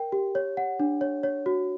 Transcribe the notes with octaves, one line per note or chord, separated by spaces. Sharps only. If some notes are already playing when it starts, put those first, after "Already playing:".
Already playing: A#4 G5
G4
C#5
F#5
D4
C#5
C#5
F#4